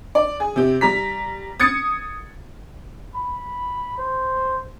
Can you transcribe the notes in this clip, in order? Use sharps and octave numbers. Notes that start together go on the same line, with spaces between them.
D5
G#4
C3 G4
G3 A#5 B6
D#6 G#6 A6 C#7
B5
C5